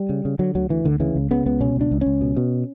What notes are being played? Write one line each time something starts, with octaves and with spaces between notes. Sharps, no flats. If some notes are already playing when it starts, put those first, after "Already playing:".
Already playing: G3
C#3
C#3
D3 F#3
D2 F#3
D2 E3
D2 D3
C#3 E3
C#2
C#3 B3
C#2 B3
B2 C#4
C#2 D4
C#2
C#4
C#2
B2
B2